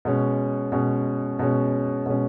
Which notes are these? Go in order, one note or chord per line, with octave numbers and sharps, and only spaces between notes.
B2 G#3 C#4
B2 G#3 C#4
B2 G#3 C#4
B2 G#3 C#4